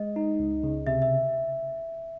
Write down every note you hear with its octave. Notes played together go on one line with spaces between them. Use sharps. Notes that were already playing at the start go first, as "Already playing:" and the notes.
Already playing: G#3 D#5
D#4
C#2
C#3
C3 E5
E5